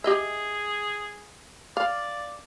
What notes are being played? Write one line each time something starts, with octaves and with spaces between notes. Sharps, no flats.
G4 G#4 D#5 E5
D5 F5